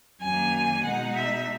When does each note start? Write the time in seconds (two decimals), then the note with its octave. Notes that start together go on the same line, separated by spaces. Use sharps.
0.21 F#2 D#3 A#3 G#5
0.84 B2 G#3 D#4 F#5
1.16 E5